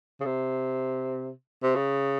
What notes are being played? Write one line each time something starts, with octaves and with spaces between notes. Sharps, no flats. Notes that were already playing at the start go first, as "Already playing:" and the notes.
C#3
C3
C3
C#3